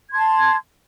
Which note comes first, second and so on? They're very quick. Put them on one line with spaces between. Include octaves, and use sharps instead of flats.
G#6 C6 A5